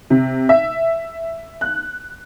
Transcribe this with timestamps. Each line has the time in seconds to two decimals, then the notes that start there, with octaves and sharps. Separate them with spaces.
0.10 C3
0.49 E5
1.61 F#6